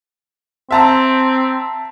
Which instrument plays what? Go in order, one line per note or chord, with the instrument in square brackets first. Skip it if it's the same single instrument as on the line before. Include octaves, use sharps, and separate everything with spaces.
[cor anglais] C4 [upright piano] E5 A5 A#5